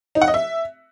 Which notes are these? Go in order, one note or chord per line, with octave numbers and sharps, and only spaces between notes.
D#4
F#5
D#5
E5